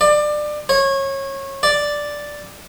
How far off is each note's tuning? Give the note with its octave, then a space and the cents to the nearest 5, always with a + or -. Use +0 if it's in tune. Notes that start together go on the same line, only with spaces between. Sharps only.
D5 +25
C#5 -25
D5 +0